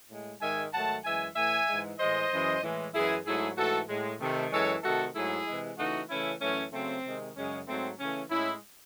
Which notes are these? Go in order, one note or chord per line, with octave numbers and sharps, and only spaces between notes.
A2 G#3
G#2 D#3 G#3 E5 G#5
G#2 D#3 F#3 A3 F#5 A5
F#2 E3 G#3 E5 G#5
A2 E3 A3 E5 G#5
G#2 E3 G#3
A2 E3 G#3 C5 D#5
F#2 E3 G#3
A2 E3 G#3
F#2 E3 G#3 E4 G#4
G#2 F#3 A3 E4 G#4
G#2 E3 A3 F#4 A4
A2 G#3
C3 D#3 A3
F#2 E3 G#3 A4 C#5
C3 D#3 A3 F#4 A4
G#2 F#3 A3 E4 G#4
C3 E3 G#3
C#3 E3 A3 D#4 F#4
C#3 E3 A3 C#4 E4
F#2 E3 A3 C#4
C#3 F#3 A3 C4
C3 D#3 G#3
F#2 C#3 G#3 C#4
G#2 F#3 A3 C4
C#3 E3 A3 C#4
A2 G#3 C#4 E4